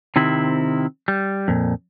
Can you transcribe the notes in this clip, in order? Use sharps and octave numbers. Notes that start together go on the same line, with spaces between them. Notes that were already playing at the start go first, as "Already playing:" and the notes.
C3 D#3 C4 E4
G3
F2 A#2